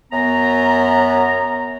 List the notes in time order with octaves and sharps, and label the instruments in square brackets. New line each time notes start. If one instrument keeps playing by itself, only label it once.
[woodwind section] F#2 B3 A#5